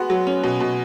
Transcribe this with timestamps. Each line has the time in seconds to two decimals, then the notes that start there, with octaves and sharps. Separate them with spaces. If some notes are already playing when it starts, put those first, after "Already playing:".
Already playing: G#3 B3 F#4
0.10 F#3
0.27 C#4
0.43 B2
0.60 B2